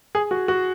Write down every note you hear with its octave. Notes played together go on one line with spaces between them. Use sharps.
G#4
F#4
F#4